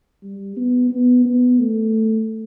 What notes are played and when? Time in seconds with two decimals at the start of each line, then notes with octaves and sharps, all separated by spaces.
0.23 G3
0.57 B3
0.91 B3
1.25 B3
1.59 A3